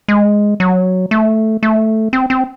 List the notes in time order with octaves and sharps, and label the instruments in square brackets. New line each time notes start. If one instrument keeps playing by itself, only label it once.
[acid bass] G#3
F#3
A3
A3
C4
C4